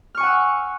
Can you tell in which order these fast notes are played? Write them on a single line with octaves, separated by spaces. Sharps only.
F6 C#6 G#5 F#5 E6